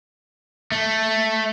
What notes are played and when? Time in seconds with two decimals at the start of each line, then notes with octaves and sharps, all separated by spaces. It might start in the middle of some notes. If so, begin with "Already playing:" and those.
0.72 A3